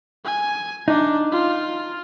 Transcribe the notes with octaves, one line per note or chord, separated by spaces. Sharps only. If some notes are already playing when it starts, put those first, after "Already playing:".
G#5
D4 D#4
F4